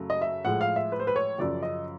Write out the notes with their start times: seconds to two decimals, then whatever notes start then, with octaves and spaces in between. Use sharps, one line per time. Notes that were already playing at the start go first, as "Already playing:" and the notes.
Already playing: F#2 C#3 F#3 A3
0.10 D#5
0.21 E5
0.45 A2 F3 G#3 F#5
0.61 F5
0.76 E5
0.92 B4
1.00 C5
1.07 B4
1.16 C#5
1.38 F#2 C#3 F3 D5
1.63 D#5